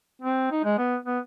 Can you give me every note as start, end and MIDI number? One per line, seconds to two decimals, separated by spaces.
0.22 0.51 60
0.51 0.62 63
0.64 0.78 56
0.78 0.97 59
1.06 1.19 59